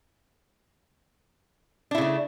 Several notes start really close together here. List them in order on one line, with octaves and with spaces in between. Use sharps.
D4 E4 C#3 A3